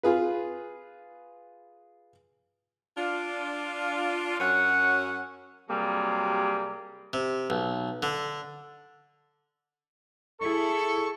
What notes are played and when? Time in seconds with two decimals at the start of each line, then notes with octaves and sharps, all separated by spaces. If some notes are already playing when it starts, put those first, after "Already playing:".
0.03 F4 G#4 B4
2.98 D4 F4
4.40 F#2 F#3 C#4 F#5
5.69 C3 F#3 G3 A#3 G#4
7.13 C3
7.50 B1
8.03 D3
10.42 E4 G#4 A4 C#6